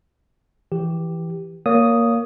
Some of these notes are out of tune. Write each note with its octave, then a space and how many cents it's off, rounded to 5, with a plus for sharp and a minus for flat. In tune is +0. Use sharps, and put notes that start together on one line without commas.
E3 +0 G4 +0
A#3 +0 C#5 +30 D#6 +0